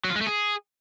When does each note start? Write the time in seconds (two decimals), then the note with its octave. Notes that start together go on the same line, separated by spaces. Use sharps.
0.05 F#3
0.10 F4
0.16 G#3
0.21 A3
0.27 G#4